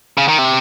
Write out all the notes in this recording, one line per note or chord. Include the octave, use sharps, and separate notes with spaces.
C#3
D#3
C3